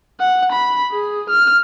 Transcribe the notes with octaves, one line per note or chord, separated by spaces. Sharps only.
F#5
B5
G#4
F6